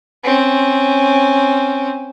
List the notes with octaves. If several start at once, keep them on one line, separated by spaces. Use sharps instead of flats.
C4 C#4